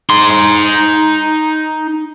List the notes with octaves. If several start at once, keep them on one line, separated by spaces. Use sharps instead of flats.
D#4 C6